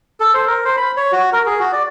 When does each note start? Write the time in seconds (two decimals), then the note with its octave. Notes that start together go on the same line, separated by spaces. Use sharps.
0.20 A4
0.34 C5
0.47 A#4
0.65 C5
0.77 B5
0.97 C#5
1.12 F#4
1.33 A#4
1.46 G#4
1.60 F#4
1.73 D5